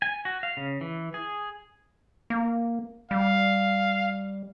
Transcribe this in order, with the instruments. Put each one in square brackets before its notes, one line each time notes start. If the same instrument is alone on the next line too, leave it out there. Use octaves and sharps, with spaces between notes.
[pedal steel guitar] G#5
F#4
F5
C#3
E3
G#4
[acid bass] A#3
[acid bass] G3 [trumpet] F5